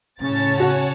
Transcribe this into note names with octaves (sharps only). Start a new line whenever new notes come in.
A2 C#3 C#4 C#5 A5 A6
F#4 F#5 G#5